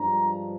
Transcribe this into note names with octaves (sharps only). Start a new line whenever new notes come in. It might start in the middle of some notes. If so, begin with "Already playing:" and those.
Already playing: G2 F3 G#3 D4 A#5